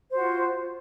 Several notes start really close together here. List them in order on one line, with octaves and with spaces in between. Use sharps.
C5 F#4 F4